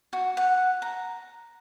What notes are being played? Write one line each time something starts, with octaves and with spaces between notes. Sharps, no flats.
F#4
F#5
A#5